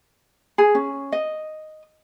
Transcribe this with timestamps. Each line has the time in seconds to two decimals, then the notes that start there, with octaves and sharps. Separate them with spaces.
0.58 G#4
0.75 C#4
1.12 D#5